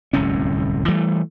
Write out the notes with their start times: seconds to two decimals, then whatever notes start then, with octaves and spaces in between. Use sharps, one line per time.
0.13 D1 C2 F#2 C#4
0.88 E3 G3 A3